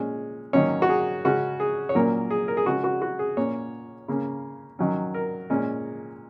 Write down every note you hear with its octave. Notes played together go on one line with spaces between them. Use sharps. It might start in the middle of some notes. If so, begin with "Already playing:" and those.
Already playing: A#2 G#3 C#4
D#3 F#3 A#3 C#4 C#5
F#4
G#4
C#3 G#3 C#4 F#4
G#4
C#5
A#2 F#3 A#3 C#4 A#4
G#4
A#4
G#4
C#3 G#3 C#4 F#4
F#4
F#4
G#4
A#2 A#3 C#4 C#5
C#3 A#3 C#4
D#3 F#3 C#4
A#4
A#2 G#3 C#4